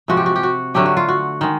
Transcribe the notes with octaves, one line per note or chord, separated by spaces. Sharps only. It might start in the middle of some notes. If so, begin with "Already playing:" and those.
C3 F3 G#3 F#4
G4
F#4
G4
F#4
D3 F#3 A3 D4 G4
F#4
F4
F#4
D#3 G#3